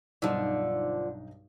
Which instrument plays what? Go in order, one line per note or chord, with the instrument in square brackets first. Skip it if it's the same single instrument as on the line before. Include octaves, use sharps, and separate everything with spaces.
[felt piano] B1 G2 D#4 [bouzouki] D3 F3